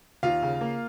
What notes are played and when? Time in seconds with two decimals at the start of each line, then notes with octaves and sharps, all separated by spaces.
0.23 D#2 F4 F5
0.42 C#3
0.61 A#3